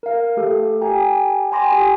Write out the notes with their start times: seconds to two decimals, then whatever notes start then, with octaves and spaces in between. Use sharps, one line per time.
0.03 A#4 F5
0.37 A3 G4 A4
0.81 G4 G5 G#5 A#5
1.52 G5 G#5 B5 C6 D6 A#6
1.72 G4